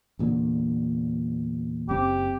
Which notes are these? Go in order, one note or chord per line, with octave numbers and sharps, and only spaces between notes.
E2 A#2 D3
F#1 C4 G4